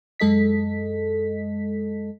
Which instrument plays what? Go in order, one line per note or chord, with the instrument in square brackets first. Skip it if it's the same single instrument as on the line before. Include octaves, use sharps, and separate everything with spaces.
[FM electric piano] F#2 G#3 A4 D#5 B6